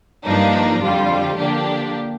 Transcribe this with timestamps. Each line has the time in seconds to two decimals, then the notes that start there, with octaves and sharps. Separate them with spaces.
0.25 G2 F3 A#3 D4 D#4
0.81 F2 D3 G3 F4
1.37 D3 F3 A#3 D4 G4